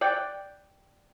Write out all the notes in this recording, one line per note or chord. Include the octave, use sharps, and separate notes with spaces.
D5 F#5 G5